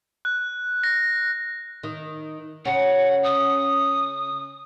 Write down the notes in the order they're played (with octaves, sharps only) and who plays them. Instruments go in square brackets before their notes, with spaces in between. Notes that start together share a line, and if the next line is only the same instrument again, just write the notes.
[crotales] F#6
A#6
[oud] D#3
[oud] C#3 C#4 [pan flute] F#5
[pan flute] D#6